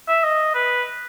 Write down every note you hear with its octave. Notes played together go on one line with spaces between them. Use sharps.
E5
D#5
B4